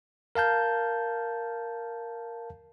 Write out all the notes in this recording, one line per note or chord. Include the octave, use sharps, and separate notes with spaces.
A#4 F5 A5 G6